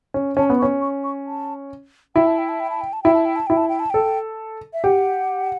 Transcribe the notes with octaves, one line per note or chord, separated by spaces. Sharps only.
C#4
C#4 A5
B3
C#6
C#4
C#6
C#6
A5
E4 G5
A5
G5
A5
G5
A5
G5
A5
E4 G5
A5
G5
A5
E4 G5
A5
G5
A5
A4 G5
E5
G4 F#5